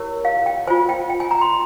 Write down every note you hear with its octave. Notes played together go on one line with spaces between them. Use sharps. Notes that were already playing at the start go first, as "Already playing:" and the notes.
Already playing: E4 G4 A#4 C#5
F5
G5
F4 C5 G#5
G5
G5
G#5
A#5
C6